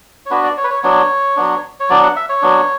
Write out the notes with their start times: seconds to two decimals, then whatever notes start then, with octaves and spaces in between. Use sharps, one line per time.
0.26 C#5
0.30 B3 D4 F#4 B4
0.44 D5
0.57 C#5
0.64 B4
0.70 C#5
0.83 F#3 B3 D4 C#5
1.36 F#3 B3 D4
1.80 C#5
1.90 F#3 B3 D4 D5
2.03 F#5
2.16 E5
2.29 C#5
2.42 F#3 B3 D4